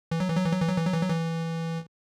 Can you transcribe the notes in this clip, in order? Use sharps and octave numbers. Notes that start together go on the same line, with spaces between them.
E3
F#3
E3
F#3
E3
F#3
E3
F#3
E3
F#3
E3
F#3
E3